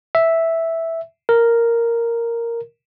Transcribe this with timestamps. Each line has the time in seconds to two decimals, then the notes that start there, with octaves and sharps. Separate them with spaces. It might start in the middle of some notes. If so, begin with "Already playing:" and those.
0.15 E5
1.29 A#4